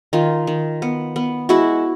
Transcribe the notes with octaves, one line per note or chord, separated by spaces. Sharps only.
D#3 D#4 F4
D#3
B3
B3
G#3 E4 F#4